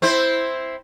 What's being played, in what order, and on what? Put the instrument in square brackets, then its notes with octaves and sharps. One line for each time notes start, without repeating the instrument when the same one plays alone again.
[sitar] C4 E4 C5